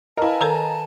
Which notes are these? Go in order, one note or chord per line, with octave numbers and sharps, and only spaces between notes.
E4 A#4 B4 D#5 F5 G#5 A5
D#3 A4 A#4 A#5